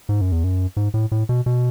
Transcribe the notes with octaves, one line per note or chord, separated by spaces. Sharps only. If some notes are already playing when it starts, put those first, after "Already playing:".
G#2
F#2
E2
F#2
G#2
A2
A2
B2
B2